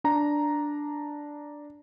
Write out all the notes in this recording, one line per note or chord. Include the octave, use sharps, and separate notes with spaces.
D4 A#5